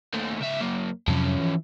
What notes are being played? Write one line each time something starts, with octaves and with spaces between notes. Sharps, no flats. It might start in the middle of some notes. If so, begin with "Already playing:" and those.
D#2 A3
C#2 E5
F#2 A#3
F2 C3 F3 F#3 C#4
E3